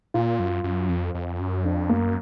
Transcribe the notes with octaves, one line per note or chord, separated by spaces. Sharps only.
A#2 F4
F#2
F#2
F2
F2
F#2
F2 D4
F#2 A#3